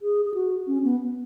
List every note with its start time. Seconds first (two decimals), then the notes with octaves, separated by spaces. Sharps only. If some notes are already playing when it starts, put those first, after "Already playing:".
0.02 G#4
0.25 G#4
0.34 F#4
0.67 C#4
0.84 B3